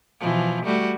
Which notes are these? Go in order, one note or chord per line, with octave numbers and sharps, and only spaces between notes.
B2 E3 F3
G3 A3 F#4